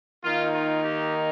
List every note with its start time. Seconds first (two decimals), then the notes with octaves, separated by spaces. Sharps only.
0.24 D#3 A#3 D#4 F4
0.54 F4
0.84 G4